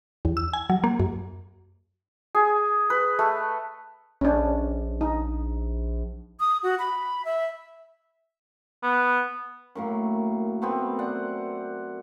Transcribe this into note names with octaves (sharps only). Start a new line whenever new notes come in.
E2
E6
G#5
F#3
A#3
F#2
G#4
B4
A3
A#1 C#4 D4
D#4
D#6
F#4
B5
E5
B3
F#2 A2 A#3
A3 B3 C4
C5 D5 F#5